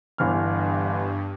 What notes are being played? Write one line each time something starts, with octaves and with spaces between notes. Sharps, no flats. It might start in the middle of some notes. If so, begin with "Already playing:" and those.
G1 G2 E3 F6